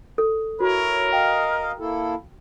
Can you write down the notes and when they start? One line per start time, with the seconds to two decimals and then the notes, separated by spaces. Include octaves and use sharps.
0.18 A4
0.60 E4 F#4 A#4 C#5
1.12 D#5 F5 G5
1.80 A#3 E4 A4